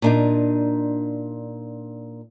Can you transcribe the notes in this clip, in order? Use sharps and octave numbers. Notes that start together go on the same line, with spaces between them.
A#2 D4 D#4